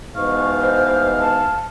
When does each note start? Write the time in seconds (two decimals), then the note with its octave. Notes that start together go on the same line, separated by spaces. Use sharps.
0.16 G#2 B2 E3 F5 C#6
0.61 C5
1.21 A5